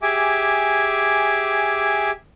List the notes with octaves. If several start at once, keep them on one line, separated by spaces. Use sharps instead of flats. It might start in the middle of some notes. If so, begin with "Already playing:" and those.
G4 G#4 E5 G#5 D6